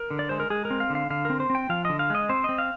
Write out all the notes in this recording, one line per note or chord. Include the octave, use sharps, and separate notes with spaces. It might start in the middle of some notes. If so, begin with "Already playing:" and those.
Already playing: A#4
D3
D5
G#3 C5
A#4
G#3 G#4
A#4
C4
F5
D3
F5
D3 F5
C4 A#4
C5
C4
G5
F3 F5
D3 D#5
F5
G#3 D#5
C4 C5
C4 D#5
F5